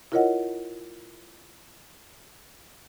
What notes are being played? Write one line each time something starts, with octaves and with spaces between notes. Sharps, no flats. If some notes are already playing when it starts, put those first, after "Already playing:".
E4 F4 A#4 C#5 D#5 F#5